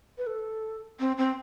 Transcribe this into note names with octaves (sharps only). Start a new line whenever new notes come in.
B4
A4
C4
C4